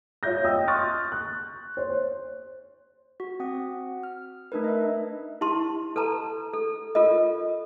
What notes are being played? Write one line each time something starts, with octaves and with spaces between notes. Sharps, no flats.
F4 C#5 E5 G6 A#6
D#5 G5 D#6 E6
C6 C#6 D#6 F6 F#6 A6
F#6
C5 C#5
F#4
C4 F#5 D#6
F6
A3 D4 D#4 A#4 B4
D#5 E5
E4 G4 A5 C6
A4 B4 A5 A#5
A4
F4 A4 A#4 D#5